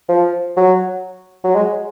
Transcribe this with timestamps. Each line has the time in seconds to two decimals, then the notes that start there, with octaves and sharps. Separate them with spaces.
0.09 F3
0.57 F#3
1.44 F#3
1.55 G#3